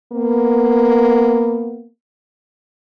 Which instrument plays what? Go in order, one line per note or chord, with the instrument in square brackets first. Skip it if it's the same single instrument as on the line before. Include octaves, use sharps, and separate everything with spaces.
[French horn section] A#3 B3